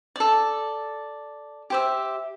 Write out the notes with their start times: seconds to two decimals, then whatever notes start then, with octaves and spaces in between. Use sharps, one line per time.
0.16 A4 D5
1.70 G4 C5 E5